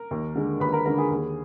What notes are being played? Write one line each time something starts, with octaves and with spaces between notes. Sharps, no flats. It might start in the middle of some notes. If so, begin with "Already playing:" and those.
Already playing: A#4
D#2
D3 G#3
D#2 B4 B5
A#4 A#5
D3 G#3 A#4 A#5
G#4 G#5
D#2